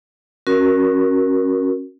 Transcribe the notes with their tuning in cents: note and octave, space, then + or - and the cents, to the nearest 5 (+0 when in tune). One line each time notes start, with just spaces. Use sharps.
C#4 -25 F#4 +0 A#4 +10